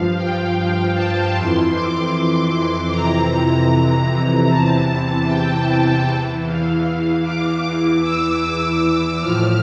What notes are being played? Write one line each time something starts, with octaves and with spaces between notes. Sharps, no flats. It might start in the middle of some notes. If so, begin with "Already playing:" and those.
Already playing: G2 F3 F5
G5
A5
F2 E3 C6
D6
C6
F2 C3 E3 A#5
E2 C3 E3 A5
G5
E2 E3
F5
D6
E2 E3
E6
E6
F3 F6
A2